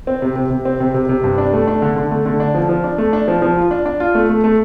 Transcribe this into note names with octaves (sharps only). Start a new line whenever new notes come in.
C4
C3
C3
C3
C4
C3
C3
C3
G2
D4
A3
D4
D3
D3
A3
D3
D4
F3
F3
D4
A3
D4
F3
F3
F4
D4
D4
F4
A3
A3
A3